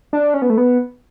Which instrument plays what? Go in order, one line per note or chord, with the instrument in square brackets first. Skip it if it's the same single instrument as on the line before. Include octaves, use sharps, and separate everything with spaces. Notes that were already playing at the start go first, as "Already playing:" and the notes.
[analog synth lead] D4
C#4
B3
A3
B3